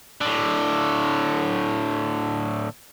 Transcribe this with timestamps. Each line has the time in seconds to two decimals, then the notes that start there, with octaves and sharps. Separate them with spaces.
0.21 A2 D3